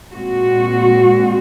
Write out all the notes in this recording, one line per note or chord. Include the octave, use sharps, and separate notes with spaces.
A#2 G#3 C4 F#4